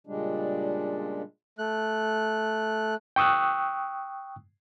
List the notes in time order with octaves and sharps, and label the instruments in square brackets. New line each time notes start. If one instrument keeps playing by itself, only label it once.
[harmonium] A#2 C#3 G3 G#3 D4
[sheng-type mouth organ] A3 F#6
[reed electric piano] G5 C#6 D#6 E6 F#6